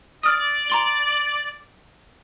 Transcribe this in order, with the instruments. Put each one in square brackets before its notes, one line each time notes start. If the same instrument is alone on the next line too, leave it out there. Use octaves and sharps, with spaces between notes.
[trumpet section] D5 [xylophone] D#6 F6
[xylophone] A#5 C6 G7